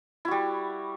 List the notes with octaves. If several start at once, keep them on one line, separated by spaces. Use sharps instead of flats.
G3 E4 F#4